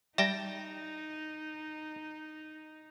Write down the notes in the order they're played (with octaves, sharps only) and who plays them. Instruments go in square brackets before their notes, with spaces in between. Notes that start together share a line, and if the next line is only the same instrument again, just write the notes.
[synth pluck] G3 [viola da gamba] D#4 [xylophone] E5 A#6 [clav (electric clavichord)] G5 A5